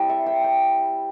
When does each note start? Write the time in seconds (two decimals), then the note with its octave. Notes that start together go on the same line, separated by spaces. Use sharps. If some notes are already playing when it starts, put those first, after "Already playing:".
Already playing: G3 C4 E4 G5 A5
0.09 E5
0.26 G5
0.44 G5